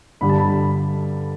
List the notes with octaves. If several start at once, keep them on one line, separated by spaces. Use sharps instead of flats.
G2 D3 G3 B5
A5
B5